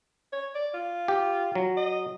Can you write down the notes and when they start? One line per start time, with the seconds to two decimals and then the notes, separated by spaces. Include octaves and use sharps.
0.32 C#5
0.55 D5
0.74 F4
1.08 G4
1.55 F#3
1.77 D#5